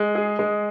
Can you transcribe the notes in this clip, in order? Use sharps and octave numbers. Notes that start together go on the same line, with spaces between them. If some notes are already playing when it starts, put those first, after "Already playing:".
Already playing: G#3
G#4
G#3